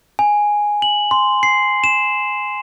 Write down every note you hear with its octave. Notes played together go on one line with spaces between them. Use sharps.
G#5
F#7
C6
C7
E7